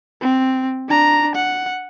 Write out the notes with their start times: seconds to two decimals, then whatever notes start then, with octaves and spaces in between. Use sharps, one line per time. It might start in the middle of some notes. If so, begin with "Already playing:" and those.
0.22 C4
0.89 D4 A#5
1.36 F#5